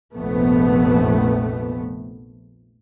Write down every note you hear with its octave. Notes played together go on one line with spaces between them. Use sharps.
F1 A#1 F2 A3 B3